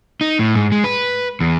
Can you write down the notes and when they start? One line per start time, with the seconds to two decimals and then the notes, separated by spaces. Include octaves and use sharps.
0.21 D#4
0.39 A2
0.55 G#2
0.72 G#3
0.84 B4
1.40 E2